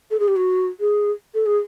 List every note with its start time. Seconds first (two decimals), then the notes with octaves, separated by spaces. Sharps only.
0.10 A4
0.19 G#4
0.28 G4
0.36 F#4
0.80 G#4
1.34 A4
1.46 G#4